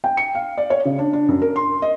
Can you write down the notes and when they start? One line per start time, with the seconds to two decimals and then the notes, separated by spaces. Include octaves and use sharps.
0.04 G5
0.17 C#7
0.35 F5
0.58 D5
0.70 C#5
0.85 C#3
0.99 D4
1.13 D4
1.28 F#2
1.42 A#4
1.56 C6
1.82 D#5